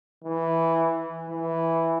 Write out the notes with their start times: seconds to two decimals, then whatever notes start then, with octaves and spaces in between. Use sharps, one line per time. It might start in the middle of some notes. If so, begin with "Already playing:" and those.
0.24 E3
1.29 E3